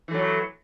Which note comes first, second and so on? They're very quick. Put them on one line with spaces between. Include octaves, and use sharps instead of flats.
E3 A3 F#3